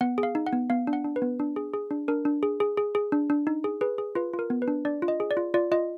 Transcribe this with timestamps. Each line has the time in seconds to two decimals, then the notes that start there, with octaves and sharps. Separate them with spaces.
0.01 B3 F#5
0.18 G#4
0.23 F5
0.35 D#4
0.47 F#5
0.53 B3
0.70 B3 F5
0.87 D4
0.93 F#5
1.05 D4
1.16 B4
1.22 B3
1.39 D4
1.56 G#4
1.74 G#4
1.91 D4
2.08 D4 A#4
2.25 D4
2.43 G#4
2.60 G#4
2.77 G#4
2.95 G#4
3.12 D4
3.30 D4
3.47 D#4
3.64 G#4
3.81 G#4 B4
3.98 G#4
4.15 F4 B4
4.33 F4
4.39 A#4
4.50 B3
4.62 B4
4.68 D4
4.85 D4 D5
5.02 F4
5.08 D#5
5.20 G#4
5.31 D5
5.37 F4
5.54 F4 D5
5.72 F4 D#5